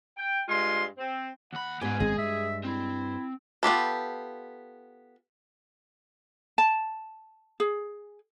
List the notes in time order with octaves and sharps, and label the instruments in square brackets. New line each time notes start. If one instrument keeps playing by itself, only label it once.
[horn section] G5
G2 G#3 F4 C6
C4
[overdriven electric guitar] D#2 B5 [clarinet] F#5
[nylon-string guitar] G#2 B3 [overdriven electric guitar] G4 B4 [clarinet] G#5
[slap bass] G#1 F#2 C4 [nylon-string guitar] G#3 [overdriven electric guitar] G#4
[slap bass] G2 [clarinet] E5
[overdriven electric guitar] C4 [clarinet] E4
[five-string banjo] B3 F4 G4 A4
[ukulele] A5
G#4